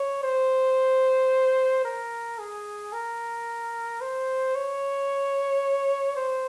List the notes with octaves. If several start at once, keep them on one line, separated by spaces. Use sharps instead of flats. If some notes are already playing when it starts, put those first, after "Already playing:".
Already playing: C#5
C5
A#4
G#4
A#4
C5
C#5
C5